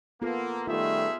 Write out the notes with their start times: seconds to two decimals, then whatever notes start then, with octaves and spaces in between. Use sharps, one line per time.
0.22 A#3 B3 F4 A4
0.67 D#3 G3 A3 D#4 F4 G#4 E5